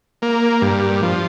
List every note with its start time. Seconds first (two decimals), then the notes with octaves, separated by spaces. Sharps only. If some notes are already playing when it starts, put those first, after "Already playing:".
0.22 A#3
0.62 G2
1.02 F3